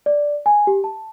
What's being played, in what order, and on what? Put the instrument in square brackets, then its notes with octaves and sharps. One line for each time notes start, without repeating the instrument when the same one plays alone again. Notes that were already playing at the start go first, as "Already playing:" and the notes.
[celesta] D5
G#5
G4
A5